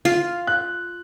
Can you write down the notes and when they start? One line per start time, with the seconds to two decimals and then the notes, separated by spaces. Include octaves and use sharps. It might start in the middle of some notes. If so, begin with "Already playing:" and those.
0.05 F4 F5
0.47 F#6